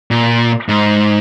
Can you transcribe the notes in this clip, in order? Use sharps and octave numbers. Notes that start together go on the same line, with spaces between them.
A#2
G#2